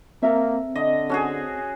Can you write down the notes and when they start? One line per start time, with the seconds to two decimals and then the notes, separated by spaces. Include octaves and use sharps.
0.23 A#3 C4 A4 A#4 E5
0.75 D3 D#5
1.09 C#4 F#4 G#4 A4 C5